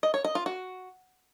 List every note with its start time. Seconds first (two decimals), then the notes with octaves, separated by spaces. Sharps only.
0.03 D#5
0.14 C#5
0.24 D#5
0.35 F4
0.46 F#4